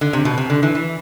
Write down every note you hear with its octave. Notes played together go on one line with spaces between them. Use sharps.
D3
C3
B2
C3
D3
E3
E3